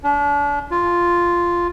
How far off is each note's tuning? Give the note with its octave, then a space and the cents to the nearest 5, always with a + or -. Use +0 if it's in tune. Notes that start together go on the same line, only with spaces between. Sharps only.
D4 -35
F4 -5